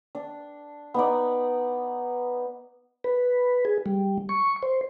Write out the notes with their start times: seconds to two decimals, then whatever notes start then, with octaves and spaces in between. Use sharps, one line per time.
0.15 D4
0.94 B3 D#4 D5
3.04 B4
3.65 G#4
3.86 G3
4.29 C#6
4.63 C5